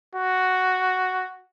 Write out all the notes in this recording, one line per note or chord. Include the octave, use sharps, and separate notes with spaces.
F#4